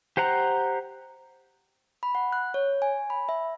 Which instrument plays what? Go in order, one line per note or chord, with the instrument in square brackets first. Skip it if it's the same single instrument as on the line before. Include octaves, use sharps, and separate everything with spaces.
[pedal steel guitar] G4 C5 F#5 A#5
[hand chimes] B5
F#5
F#6
C#5
G#5
B5
E5